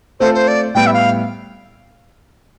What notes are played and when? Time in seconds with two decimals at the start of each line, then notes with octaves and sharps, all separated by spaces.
0.20 A3 C4 F4 A4 C5
0.34 C5
0.48 D5
0.74 A2 G3 B3 G5
0.86 E5
0.93 F5